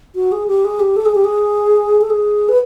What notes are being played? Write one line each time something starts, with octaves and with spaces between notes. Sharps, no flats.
F#4
G#4
G4
G#4
G4
A4
G#4
G4
G#4
A4
G#4
B4